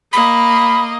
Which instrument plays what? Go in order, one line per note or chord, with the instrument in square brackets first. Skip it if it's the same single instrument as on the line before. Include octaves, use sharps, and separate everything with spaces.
[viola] A#3 D#5 [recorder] B5